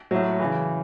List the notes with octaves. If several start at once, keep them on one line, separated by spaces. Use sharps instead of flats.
A2 F#3
C#3 E3